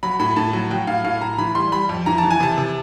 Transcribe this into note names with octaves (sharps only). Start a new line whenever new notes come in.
F#3 B5
A2 B5
A2 A5
F#3
F#3 G5
A2 F5
A2 F5
A2 A#5
E3 B5
G3 C6
G3 B5
F2
E3 A#5
A5
E3
G#5
C3 A5
C3